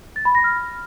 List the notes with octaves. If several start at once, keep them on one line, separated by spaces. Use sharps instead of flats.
A6
B5
A#6
F6